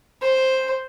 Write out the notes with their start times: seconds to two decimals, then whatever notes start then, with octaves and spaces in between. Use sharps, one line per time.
0.22 C5